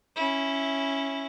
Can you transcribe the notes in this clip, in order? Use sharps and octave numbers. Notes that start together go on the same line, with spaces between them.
C#4 E4